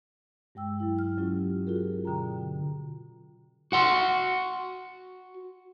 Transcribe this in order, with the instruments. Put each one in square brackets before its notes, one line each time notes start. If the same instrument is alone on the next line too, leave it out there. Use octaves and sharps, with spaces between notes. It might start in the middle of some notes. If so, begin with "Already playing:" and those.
[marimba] G2 G#3 G5 E6
F#3 E4
F6
F#3 C#4 F4 G4
F4 F#4 G#4 A#4
B2 D3 G5 A#5
[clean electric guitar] F#4 F#5 C6